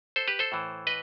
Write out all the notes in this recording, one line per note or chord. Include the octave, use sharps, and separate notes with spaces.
A4 C5
G4 B4
A4 C5
A2 E3
B4 D#5